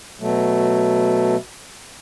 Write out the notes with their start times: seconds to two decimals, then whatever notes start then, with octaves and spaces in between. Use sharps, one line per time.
0.19 B2 F#3 A3